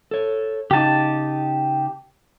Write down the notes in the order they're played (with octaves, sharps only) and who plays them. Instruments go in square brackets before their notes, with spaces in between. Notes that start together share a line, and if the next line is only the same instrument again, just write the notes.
[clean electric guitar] A4 C#5
[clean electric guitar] C#3 D#4 [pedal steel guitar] G4 A5